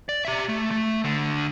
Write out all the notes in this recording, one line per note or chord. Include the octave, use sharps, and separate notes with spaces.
D5
G4 E5
A3
A3
D2 D3